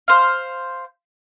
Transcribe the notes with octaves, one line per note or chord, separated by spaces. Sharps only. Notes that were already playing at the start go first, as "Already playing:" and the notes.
C5 F5